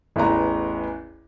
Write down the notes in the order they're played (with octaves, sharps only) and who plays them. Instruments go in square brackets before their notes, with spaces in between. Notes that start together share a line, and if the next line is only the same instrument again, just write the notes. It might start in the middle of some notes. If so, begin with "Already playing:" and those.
[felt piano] A1 E2 B4 A#5